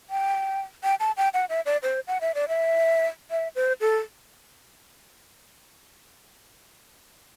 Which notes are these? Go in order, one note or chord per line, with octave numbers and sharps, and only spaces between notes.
G5
G5
A5
G5
F#5
E5
D5
C5
F#5
E5
D5
E5
E5
C5
A4